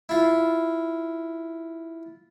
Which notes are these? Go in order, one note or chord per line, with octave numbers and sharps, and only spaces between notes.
E4 F4